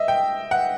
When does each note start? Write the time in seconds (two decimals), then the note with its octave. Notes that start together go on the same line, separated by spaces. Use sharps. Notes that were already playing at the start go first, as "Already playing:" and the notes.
Already playing: D#5 E5
0.08 G5
0.51 F#5